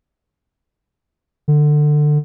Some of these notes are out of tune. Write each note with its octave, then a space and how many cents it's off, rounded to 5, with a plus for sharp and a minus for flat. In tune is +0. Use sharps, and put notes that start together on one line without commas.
D3 +20